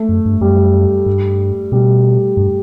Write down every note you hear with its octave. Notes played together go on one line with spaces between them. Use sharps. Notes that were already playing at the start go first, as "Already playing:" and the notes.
Already playing: A3
F#2
G2
F#2 G3
G2
B2 G3
G2